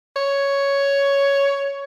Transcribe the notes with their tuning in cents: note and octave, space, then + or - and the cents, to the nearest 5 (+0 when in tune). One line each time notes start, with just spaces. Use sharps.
C#5 +5